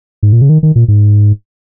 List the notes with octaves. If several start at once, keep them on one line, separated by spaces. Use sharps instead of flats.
G#2
A#2
C#3
D#3
D#3
A#2
G#2